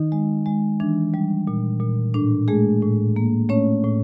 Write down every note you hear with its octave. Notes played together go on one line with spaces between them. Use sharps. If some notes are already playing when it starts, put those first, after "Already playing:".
Already playing: D#3 D#4
G#3
G#3
E3 D4
G3
A#2
A#2
A2 D4
G#3 A3 G#4
A2
A#3
A3 C#4 C#5
A2